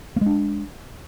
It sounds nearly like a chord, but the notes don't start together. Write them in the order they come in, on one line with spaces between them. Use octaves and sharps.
A#3 G#3 D4